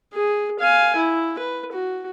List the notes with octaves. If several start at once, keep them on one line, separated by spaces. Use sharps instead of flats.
G#4
F5 G#5
E4
B4
F#4